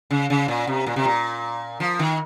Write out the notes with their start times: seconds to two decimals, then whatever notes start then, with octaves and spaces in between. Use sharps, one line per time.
0.11 C#3
0.30 C#3
0.48 A#2
0.67 C3
0.87 A#2
0.96 C3
1.05 A#2
1.80 F3
1.99 D#3